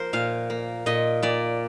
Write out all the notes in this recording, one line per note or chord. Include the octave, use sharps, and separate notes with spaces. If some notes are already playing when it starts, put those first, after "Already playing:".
Already playing: F3 A#3 A#4 C5
A#2 F5
A#3
A#2 D#5
A#2 D5